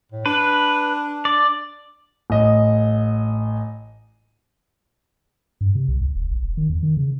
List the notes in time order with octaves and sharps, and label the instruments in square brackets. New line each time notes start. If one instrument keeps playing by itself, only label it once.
[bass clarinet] A2
[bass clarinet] D4 [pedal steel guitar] B4
[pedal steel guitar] D5
[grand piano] A1 D#5
[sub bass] G2
C3
C2
C#2
D#1
A1
E1
D#3
E2
D#3
C#3